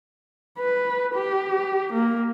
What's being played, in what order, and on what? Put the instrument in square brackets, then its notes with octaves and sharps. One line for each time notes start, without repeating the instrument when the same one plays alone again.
[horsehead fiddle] B4
G4
A#3